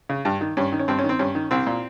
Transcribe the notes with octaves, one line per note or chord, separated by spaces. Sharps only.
C#3
G2
D#3
G2 C#4
D#3
C#4
G2 C4
C#4
D#3
C4
G2 C#4
D#3
C2 C4
A#2